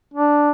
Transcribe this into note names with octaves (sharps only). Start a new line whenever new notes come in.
D4